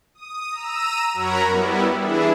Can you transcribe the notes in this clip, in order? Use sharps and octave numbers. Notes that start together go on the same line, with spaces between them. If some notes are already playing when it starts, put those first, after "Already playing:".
D#6
A#5 E6 D#7
F#2 F#4 A#4 C#5 A#5 B5
G3 B3 E4
E3 D4 E4 G#4